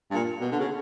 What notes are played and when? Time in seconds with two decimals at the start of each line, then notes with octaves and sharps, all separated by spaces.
0.11 G2
0.14 A#2
0.41 B2
0.52 D3
0.60 C#3